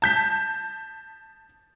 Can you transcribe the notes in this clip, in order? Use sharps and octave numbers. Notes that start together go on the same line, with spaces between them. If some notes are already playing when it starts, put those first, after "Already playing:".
A5 G6 B6